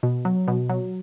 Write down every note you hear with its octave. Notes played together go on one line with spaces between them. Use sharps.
B2
F#3
B2
F#3